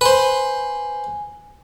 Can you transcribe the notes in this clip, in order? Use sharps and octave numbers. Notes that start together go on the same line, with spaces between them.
B4 C5 G#5